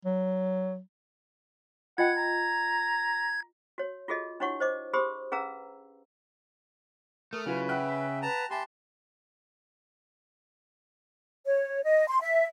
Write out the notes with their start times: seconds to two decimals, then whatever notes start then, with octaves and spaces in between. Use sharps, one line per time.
0.05 F#3
1.98 F4 D#5 F#5 G5 G#6
2.17 A#5
3.78 F#4 C#5
4.08 F4 F#4 G#4 A4 D#5
4.40 D4 E4 F#4 C#5 F#5 C#6
4.60 C5 D#5 D6
4.93 G4 G#4 C5 B5 C6 D#6
5.32 C#4 G#4 B4 F5 A#5 E6
7.33 A3 A#4 D#6 F6
7.46 C#3 F#3 E4 F4 B4
7.69 E5 F#5 G5 F#6
8.22 B4 A5 A#5
8.50 G4 E5 G#5 A5 B5 C6
11.45 C#5
11.84 D#5
12.07 C6
12.21 E5